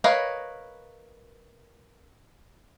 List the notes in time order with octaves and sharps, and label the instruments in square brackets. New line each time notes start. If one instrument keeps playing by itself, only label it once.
[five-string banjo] A#4 B4 C#5 D#5 F5